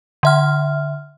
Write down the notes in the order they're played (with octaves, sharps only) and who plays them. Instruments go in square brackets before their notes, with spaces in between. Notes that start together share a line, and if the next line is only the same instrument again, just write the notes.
[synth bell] D3 E5 F6